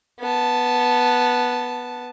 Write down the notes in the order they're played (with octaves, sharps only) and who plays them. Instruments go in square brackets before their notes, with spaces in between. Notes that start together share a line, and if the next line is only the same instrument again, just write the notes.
[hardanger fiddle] B3 A5